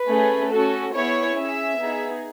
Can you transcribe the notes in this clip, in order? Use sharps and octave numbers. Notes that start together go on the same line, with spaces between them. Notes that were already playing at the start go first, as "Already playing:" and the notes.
Already playing: B4
A3 C#4 G#4
C#4 F#4 A4
B3 E4 G#4 C#5
C#4 G#4 E5
B3 D#4 G#4